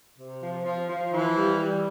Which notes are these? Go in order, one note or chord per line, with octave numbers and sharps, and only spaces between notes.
C3
F3
F3
F3
E3
G3
G3